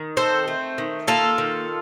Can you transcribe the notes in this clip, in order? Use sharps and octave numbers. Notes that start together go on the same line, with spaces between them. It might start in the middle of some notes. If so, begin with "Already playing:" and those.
Already playing: D#3
C4 A4 C5
A3
D#3
A#3 F4 A4
D#3